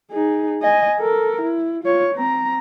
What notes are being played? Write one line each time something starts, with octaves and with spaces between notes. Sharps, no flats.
D#4 G#4
D#5 G#5
A4 A#4
E4
F4 C#5
C4 A#5